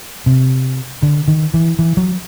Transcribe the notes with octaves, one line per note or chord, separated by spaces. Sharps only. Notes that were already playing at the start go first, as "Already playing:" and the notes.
C3
D3
D#3
E3
E3
F#3